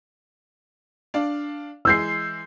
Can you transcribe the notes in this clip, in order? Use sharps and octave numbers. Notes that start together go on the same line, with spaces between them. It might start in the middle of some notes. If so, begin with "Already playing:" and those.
D4 D5 F5
E3 G#3 G#4 E6 G6 C7